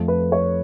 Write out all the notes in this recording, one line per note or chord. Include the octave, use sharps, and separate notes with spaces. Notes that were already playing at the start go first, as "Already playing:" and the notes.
Already playing: F2 F3 A3
B4
C#5